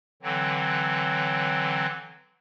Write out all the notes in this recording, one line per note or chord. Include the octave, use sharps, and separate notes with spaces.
D3 E3 F#3 C4